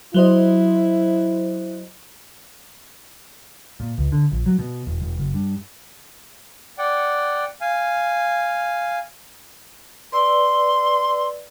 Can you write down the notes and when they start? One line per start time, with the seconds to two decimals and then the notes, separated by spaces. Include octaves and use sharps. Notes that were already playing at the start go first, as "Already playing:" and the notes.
0.14 F#3 E4 C5 D#5
3.80 A#2
3.98 C#2
4.12 D3
4.32 A#1
4.46 F#3
4.59 B2
4.87 E1
5.02 E1
5.18 F#1
5.34 G2
6.78 D5 F#5 G5
7.61 F5 G#5
10.12 B4 D5 C6 E6